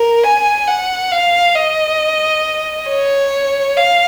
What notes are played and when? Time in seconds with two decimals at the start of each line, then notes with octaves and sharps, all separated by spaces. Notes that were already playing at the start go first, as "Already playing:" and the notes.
Already playing: A#4
0.24 G#5
0.67 F#5
1.12 F5
1.55 D#5
2.88 C#5
3.77 F5